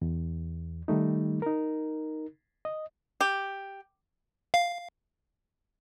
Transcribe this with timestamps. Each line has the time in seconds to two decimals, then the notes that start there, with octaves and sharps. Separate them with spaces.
0.02 E2
0.88 D#3 G3 A3 D#4
1.42 D#4 A#4
2.65 D#5
3.21 G4
4.54 F5